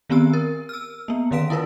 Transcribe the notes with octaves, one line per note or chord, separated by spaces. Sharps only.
D#3 B3 C4 G4 E6
A#4
E6 F6
A#3 B3
D3 D#3 C#4 F5 B6 D7
E4 F4 A#4 B4